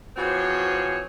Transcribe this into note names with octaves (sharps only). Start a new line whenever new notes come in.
E3 F3 C4 F#4 G#4 C#5